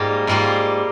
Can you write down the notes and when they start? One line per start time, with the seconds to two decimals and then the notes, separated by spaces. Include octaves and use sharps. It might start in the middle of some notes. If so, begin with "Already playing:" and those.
Already playing: G#2 G3 A#3 F4
0.27 G#2 G3 A#3 F4